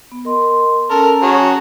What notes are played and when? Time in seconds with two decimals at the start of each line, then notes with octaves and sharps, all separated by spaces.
0.11 B3
0.25 A#4 D#5 C6
0.90 C#4 A4 A#4 A5 A#5
1.22 F#4 G#4 C#5